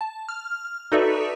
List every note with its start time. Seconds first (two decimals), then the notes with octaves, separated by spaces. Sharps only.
0.01 A5
0.29 F6
0.92 D#4 F#4 A4 B4 D5 E5